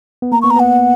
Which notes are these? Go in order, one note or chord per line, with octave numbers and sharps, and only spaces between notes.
B3
A#3 A#5
B3 C#6
A#5
B3 F#5